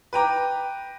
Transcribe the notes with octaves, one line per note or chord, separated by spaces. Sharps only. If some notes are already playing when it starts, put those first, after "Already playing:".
B4 G5 A#5 D6